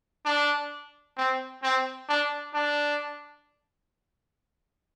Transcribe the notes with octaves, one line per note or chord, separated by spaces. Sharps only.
D4
C4
C4
D4
D4